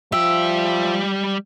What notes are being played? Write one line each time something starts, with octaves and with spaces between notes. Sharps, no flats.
F3 G3 E5 G5